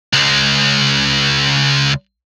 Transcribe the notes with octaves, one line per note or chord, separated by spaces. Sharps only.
C#2 G#3